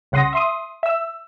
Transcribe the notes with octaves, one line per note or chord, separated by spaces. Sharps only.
C2 C#3 F#5 C6 D#6 A#6
E5 C6 D#6
E5 E6